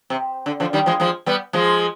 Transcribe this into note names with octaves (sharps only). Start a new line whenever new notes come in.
C3
D3
D3 F3
D#3 G3
F3 G#3
F3 G#3
G3 B3
F3 G#3